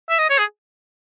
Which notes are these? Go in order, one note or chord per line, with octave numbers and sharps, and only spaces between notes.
E5
D#5
C#5
G#4